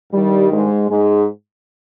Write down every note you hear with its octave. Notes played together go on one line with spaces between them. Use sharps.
G2 D#3 G3
G#2 G#3
G#2 G#3